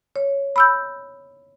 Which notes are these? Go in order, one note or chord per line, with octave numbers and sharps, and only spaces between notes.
C#5
B5 E6 G6